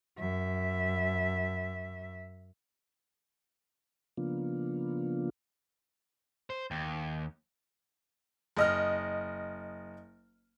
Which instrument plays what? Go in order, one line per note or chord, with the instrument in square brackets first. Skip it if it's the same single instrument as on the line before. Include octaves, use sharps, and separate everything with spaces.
[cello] F#2 E5
[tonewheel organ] C#3 F3 A#3 B3 D4 F4
[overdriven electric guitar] C5
D#2
[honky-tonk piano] F#1 D#5 F6